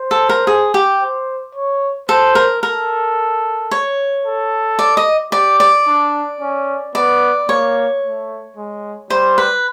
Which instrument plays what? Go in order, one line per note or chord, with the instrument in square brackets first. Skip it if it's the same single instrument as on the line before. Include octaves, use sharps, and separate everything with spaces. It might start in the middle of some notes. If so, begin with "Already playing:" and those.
Already playing: [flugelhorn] C5
[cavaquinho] A4
A#4
G#4
G4
[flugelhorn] C5
C#5
[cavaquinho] A4 [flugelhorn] C5
[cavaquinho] A#4
[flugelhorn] A4 [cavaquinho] A#4
[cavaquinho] C#5
[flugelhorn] A4
[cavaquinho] D5
D#5
[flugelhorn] G4 [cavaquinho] D5
[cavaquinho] D5
[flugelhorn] D4
C#4
[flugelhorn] B3 [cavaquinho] D5
[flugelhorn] A#3 [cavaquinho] C#5
[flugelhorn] A3
G#3
[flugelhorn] G3 [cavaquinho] C5
[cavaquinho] B4